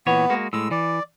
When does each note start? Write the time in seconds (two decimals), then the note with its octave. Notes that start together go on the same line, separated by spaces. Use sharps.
0.07 A#2 E3 B3 C#5
0.30 G#3 A#3 F#4
0.53 A2 G#3 E6
0.71 E3 D5